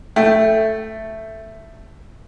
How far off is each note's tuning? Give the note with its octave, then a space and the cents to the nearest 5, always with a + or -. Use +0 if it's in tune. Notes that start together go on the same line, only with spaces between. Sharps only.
A3 +0 G5 +0